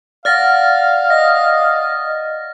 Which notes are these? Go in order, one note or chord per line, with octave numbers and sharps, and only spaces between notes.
D5 F5 F#5 F6 A6 A#6
D#5 A#6